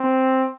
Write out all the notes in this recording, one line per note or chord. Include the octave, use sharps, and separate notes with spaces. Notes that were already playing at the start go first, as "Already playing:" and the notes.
Already playing: C4